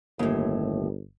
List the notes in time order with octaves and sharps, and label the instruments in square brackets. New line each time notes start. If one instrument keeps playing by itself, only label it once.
[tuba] G1 [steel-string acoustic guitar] D#2 A2